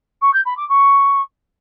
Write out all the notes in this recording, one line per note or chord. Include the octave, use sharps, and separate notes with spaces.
C#6
G6
B5
D6
C#6